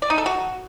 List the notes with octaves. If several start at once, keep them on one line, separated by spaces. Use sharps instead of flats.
D5
D#4
A4
F#4